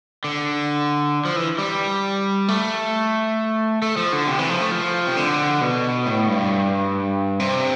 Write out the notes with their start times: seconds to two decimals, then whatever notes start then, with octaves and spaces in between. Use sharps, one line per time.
0.24 D3
1.25 F3
1.36 E3
1.59 G3
2.48 A3
3.82 A3
3.97 F3
4.12 D3
4.28 C3
4.39 E3
4.49 F3
4.60 A3
4.71 F3
5.07 C3
5.16 D3
5.61 B2
6.06 A2
6.28 G2
7.40 C3